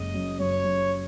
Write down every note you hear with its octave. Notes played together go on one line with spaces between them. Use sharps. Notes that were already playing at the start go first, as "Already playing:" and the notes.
Already playing: F#1 G#3 D#5
F#2
F#2 C#5
F#2